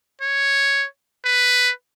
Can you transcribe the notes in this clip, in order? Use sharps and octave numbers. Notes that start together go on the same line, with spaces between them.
C#5
B4